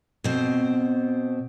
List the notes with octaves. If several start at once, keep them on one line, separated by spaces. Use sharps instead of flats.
B2 C4